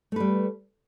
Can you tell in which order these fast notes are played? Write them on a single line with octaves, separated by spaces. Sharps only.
A3 B4 G3